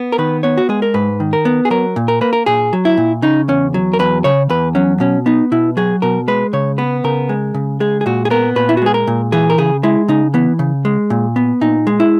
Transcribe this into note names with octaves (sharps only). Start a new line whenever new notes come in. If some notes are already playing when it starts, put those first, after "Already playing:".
Already playing: B3
A#4
D#3 B4
B3 C#5
F#4
G#3 G#4
A#4
G#2 B4
D#3
A#4
B3
G#4
F#3 A#4
A#2
A#4
A#3 B4
A#4
A#2 G#4
F#3
E4
A#2
C#3 D#4
E2 C#4
F#3
A#4
E2 B4
C#3 C#5
E2 B4
F#3 C#4
B2 C#4
B3 D#4
B2 E4
F#3 G#4
B2 A#4
G#3 B4
C#3 C#5
B3 B4
C#3 A#4
G#3
C#3
G#3 G#4
G#4
A#2 F#4
G#4
B3 A#4
A#2 B4
E4
F#4
G#3 G#4
A#4
A#2
E3 G#4
A#4
C#3 G#4
G#3 E4
C#3 D#4
E3 B3
C#3
G#3
A#2
B3
A#2 D#4
G#3
E4